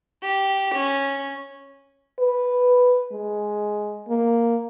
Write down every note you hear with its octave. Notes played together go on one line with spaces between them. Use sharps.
G4
C#4
B4
G#3
A#3